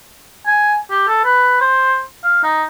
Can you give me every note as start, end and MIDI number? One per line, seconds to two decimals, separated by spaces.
0.47 0.75 80
0.91 1.03 67
1.08 1.20 69
1.25 1.58 71
1.61 2.00 72
2.24 2.43 77
2.44 2.64 63